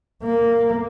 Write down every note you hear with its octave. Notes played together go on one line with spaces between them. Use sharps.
A#3